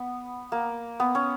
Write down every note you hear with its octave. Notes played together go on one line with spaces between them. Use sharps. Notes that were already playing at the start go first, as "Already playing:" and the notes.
Already playing: B3
A#3
B3
C#4